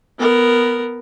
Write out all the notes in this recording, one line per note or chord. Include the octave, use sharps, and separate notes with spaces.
B3 A#4